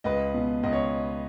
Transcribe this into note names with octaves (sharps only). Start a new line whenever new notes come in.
C#2 B4 D#5
B2
C#2 D#5
C#5